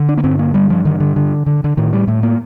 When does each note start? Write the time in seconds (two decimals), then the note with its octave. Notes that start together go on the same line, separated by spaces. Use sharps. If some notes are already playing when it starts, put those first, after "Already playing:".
Already playing: D3
0.09 D4
0.17 A#3
0.24 G2 C4
0.39 A#3
0.54 G2 G3
0.70 F3
0.85 D3 D#3
1.00 D3
1.16 D3
1.46 D3
1.64 D3
1.77 A2 D#3
1.93 G3
2.07 A2 A3
2.23 A#3